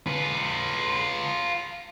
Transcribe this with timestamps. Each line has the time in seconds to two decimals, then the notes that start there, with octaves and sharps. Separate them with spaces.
0.07 F4 B4